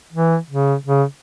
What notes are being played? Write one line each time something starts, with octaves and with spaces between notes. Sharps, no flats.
E3
C#3
C#3